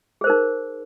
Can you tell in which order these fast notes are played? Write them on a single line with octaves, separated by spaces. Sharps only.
G#4 C5 A#4 D#4